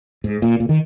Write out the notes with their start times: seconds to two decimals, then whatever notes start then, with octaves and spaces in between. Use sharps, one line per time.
0.24 G#2
0.42 A#2
0.60 A#2
0.69 D#3